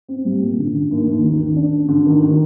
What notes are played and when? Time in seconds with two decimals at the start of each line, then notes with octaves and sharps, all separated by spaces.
0.08 C4
0.25 G3
0.41 A#2
0.58 D3
0.74 D3
0.91 D#2
1.08 D#2
1.24 D#3
1.40 D#3
1.56 D4
1.72 D4
1.88 D3
2.06 D#3
2.21 D#3